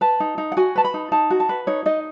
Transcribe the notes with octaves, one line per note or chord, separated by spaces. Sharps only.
B4 A5
D#4
D#4
F#5
F#4 G#5
B4 A5
B5
D#4
D#4 A5
F#4
A5
B4
D#4 C#5
D#4 D#5